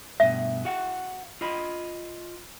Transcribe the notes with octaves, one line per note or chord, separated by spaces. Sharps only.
G2 B2 E5
F#4 F5 F#5
F4 D#5 B5